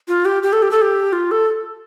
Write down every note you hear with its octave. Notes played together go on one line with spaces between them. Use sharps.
F4
G4
G4
A4
G4
A4
G4
F4
A4